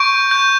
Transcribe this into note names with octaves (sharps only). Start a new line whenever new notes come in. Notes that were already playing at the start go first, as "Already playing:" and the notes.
Already playing: C#6 G6 D7
G6